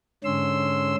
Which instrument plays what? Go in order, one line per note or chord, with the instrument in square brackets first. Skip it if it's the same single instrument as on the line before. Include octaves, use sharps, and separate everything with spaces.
[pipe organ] G#2 D3 C#4 C6 E6